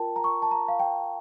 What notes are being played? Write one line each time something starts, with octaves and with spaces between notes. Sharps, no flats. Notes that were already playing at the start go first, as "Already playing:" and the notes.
Already playing: F4 A#4 G5 A5
A#5
C#6
A5
A#5
F5
G5